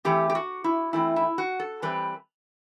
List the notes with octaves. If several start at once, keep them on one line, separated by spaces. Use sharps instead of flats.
E3 A3 C4 G4
G4
F#4
E4
E3 A3 C4 E4
E4
F#4
A4
E3 G3 C4 B4